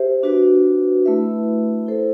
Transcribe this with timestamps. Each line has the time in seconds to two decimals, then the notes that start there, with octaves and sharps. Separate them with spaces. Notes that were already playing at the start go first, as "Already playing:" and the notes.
Already playing: G4 C5 E5
0.23 D4 F#4 B4
1.06 A3 E4 B4 E5
1.87 E4 A4 C5